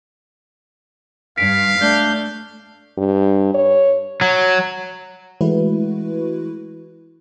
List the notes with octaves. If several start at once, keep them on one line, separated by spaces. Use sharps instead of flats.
G2 F5 B6 D7
A3 D4 G6
G2
C#5
F#3
E3 G#3 A3 E4 F#4 B4